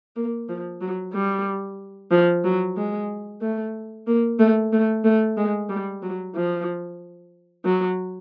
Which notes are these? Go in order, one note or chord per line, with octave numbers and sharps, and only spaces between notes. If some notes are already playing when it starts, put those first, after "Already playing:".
A#3
F3
F#3
G3
F3
F#3
G#3
A3
A#3
A3
A3
A3
G#3
G3
F#3
F3
F#3